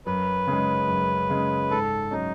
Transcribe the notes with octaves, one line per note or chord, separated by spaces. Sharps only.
F#2 B4
C#3 G#3
F#2
C#3 G#3
G#2 A4
F#3 C#4 D#4